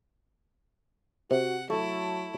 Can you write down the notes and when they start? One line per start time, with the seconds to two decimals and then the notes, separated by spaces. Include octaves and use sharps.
1.31 C3 F#4 F#5
1.70 F#3 A3 E4